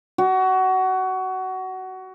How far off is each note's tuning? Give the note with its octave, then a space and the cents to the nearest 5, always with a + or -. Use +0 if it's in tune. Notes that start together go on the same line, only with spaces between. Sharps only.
F#4 +20